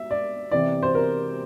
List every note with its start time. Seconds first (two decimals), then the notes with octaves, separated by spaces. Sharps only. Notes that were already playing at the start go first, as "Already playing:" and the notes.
Already playing: E5
0.11 D5
0.51 C3 E3 D5
0.83 C5
0.95 A#4